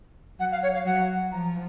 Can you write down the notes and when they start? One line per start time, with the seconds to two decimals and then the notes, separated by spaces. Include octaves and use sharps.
0.39 F#3 F#5
0.51 F5
0.62 C#5
0.74 F5
0.85 F#3 F#5
1.31 F3 A#5